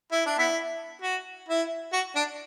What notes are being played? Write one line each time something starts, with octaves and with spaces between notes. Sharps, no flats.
E4
D4
B3 E4
F#4
E4
F#4
D4